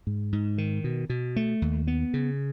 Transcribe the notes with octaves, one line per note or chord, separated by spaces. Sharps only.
G#2
G#2
D#3
B2
B2
A3
D#2
B3
C#3